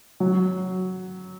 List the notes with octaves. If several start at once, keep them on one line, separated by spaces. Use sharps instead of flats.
F#3